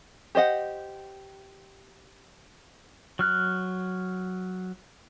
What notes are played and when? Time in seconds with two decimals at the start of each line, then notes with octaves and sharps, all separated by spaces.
0.35 G4 C5 D#5 F#5
3.19 F#3 F6 F#6